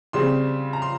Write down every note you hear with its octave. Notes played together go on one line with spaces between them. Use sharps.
C#3 G3 C4 C6
A#5
C6